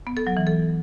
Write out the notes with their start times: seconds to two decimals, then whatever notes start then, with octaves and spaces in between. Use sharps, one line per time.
0.07 B3
0.17 A4
0.27 F#3
0.37 E3
0.47 A4